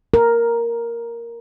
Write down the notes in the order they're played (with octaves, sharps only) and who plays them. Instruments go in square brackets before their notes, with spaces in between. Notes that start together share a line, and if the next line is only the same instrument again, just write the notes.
[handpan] A#4